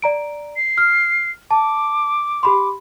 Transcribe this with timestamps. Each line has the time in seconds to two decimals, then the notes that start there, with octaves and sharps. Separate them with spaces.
0.02 D5 A#5 D7
0.56 C7
0.78 F6
1.51 A5 D6
2.43 G4 B5 C6